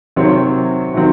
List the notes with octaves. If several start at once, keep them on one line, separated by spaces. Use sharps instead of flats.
C3 D#3 F#3 C4 C#5
C3 D#3 F#3 C4